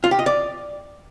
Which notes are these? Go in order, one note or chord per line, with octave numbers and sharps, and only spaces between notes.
F4
G4
D#5
D5